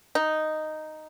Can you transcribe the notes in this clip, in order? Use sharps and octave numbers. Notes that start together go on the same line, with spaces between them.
D#4